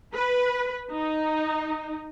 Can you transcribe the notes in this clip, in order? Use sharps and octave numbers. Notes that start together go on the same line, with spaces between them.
B4
D#4